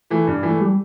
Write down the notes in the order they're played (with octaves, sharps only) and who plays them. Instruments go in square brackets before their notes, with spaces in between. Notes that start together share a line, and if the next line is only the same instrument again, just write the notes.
[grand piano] E3 A3
G2
E3 A3
[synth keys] G3